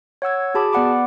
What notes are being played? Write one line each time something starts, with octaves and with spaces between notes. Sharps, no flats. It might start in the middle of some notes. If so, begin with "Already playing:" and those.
C#5 F#5 E6 G#6
F#4 G#4 A5 B5 D6
B3 D5 F#5 B5 D6